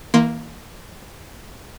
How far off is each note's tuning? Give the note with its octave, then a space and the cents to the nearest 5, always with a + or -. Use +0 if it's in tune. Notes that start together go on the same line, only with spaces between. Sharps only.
E3 -35 A#3 +0 C6 +0